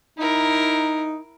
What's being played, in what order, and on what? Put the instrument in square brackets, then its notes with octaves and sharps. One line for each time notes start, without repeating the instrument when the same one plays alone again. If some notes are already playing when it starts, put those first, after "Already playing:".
[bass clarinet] D#4 [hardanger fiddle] E4 A#4